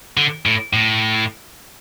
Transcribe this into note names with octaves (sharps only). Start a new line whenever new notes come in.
D3
A2
A2